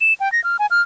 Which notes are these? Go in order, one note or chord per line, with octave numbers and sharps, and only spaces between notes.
E7
G5
A#6
F6
G#5
F6